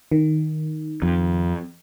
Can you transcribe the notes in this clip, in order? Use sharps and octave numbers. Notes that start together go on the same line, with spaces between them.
D#3
F2